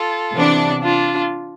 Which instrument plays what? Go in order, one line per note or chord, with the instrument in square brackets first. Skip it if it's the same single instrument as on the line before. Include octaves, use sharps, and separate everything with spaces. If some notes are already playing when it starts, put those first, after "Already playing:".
Already playing: [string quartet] F4 A4
[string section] C3 E3 B3 D4
[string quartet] D4 F4